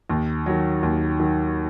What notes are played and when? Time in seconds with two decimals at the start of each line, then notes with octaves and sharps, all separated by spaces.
0.10 D#2
0.46 D#3 F#3
0.83 D#2
1.20 D#3 F#3